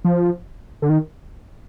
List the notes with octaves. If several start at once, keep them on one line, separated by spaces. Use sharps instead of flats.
F3
D3
D#3